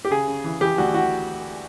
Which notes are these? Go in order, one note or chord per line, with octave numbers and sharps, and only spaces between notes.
G4
C#3 G#4
C#3
E3
E3 G4
D2 F#4
E3 F#4